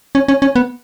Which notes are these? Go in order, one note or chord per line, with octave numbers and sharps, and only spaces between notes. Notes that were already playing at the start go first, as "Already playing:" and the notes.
C#4
C#4
C#4
B3